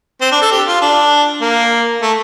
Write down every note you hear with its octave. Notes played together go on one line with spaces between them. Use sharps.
C4
D4
A4
G4
F4
D4
A#3
A3